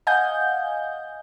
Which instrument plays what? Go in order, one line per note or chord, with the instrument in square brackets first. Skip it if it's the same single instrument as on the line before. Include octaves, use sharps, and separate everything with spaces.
[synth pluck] D#5 F5 F#5 G#5 G6